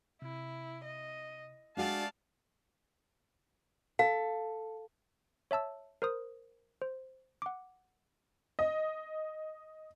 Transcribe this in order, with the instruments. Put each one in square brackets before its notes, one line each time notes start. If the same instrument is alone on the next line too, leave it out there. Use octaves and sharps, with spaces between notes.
[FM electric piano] C3 [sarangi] E4
[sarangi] D#5
[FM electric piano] G#3 [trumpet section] A3 D5 F5 [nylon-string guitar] D4 F#4 G#4 [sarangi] A5
[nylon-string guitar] A4 [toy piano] F5
[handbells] C#5 E5 A5 E6
A#4 C5 D#6
C5
F#5 D6
[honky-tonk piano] D#5